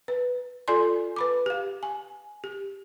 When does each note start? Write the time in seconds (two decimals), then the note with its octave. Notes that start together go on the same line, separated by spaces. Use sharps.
0.08 B4
0.68 F4 A4 D5 G#5 C6
1.16 B4 B5 D6
1.46 G4 F5
1.83 G#5
2.44 G4